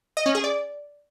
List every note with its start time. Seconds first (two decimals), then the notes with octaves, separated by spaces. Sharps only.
0.17 D#5
0.26 C#4
0.35 G#4
0.44 D5